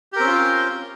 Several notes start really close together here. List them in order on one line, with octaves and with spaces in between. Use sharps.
G4 A#4 C4 C#4 F4